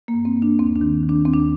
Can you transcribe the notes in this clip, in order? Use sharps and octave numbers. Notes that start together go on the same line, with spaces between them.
A#3
G2
C4
G2
D4
D#2 C4
D4
D#3
D#3
D4
D#2 C4
D4